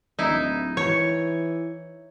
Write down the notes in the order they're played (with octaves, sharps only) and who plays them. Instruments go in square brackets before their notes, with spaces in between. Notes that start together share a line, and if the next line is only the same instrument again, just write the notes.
[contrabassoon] D1 [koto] D#4 E4
[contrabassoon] E3 [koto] C#5